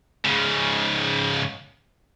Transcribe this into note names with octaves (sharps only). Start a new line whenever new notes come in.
G#2 C#3